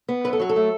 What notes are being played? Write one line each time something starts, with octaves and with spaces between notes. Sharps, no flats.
B3
F#2 B4
A4
F#3 F#4
A4
A3